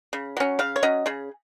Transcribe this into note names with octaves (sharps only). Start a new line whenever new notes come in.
C#3
F#3 C#4
C#3 F5
C#5
F#3 C#4 D#5
C#3 G#4